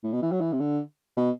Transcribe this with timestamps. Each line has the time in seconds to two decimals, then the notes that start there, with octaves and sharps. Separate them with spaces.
0.03 A2
0.13 B2
0.22 E3
0.31 F#3
0.41 E3
0.52 C3
0.60 D3
1.17 B2